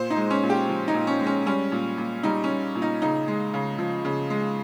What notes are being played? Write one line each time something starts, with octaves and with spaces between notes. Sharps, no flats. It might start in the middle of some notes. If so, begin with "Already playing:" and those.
Already playing: A#2 C5
D#4
G#3
C#4
A#2
G4
F3
D#4
A#2
C#4
G#3
C#4
G3 C#4
A#2
A#2
G3 D#4
C#4
G3
A#2
D#4
C#3 D#4
G#3
C#3
F3
C#3
G#3